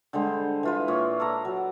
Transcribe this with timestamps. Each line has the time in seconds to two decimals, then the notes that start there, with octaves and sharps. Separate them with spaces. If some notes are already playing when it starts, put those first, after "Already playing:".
0.13 D3 G3 G#3 C5
0.63 E3 F4 B4
0.88 A#2 C#5
1.20 A4 B4 D5 A#5
1.45 F#3